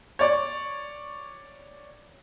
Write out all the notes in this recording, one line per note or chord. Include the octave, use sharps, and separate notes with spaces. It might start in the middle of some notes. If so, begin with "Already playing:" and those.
C#5 D5 C#6